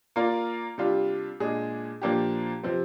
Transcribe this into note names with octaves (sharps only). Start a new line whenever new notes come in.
A#3 F4 A#4 D5
C3 G3 D4 F4
A#2 G#3 D4 G#4
A#2 F3 A#3 D4 G4
C3 F3 C4